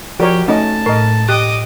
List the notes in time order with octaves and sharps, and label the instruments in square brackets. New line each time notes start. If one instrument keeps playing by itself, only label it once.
[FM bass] F3 [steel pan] F#4 A#4 C#5 [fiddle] G4 [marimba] D5
[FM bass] A3 [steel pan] C#4 D#4 D#5 [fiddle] A5
[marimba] A2 [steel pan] A#4 D#5
[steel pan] G4 [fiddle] D#5 D6 [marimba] F#6